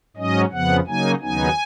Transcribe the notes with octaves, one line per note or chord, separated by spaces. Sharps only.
G#2 F#3 C#4 D#5
F2 C#3 F3 B3 F#5
C#3 F#3 A#3 D#4 G#5
D#2 C#3 F#3 B3 D#4 G#5